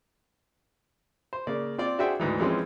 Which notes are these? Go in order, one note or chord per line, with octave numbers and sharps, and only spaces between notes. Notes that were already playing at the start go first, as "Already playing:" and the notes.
C5
C#3 A#3 D5
C4 F4 D5
D4 F#4 G#4 C5 E5 G5
D2 G#2 E3
E3 F3 G#3 C4 C#4